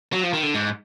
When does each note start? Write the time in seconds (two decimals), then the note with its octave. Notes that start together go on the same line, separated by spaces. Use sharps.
0.13 F#3
0.23 F3
0.33 D#3
0.43 D3
0.54 G#2